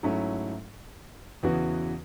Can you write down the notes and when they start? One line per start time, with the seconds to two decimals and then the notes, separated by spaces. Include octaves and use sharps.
0.03 G#2 F#3 A3 C#4 E4
1.43 E2 C#3 E3 B3 F#4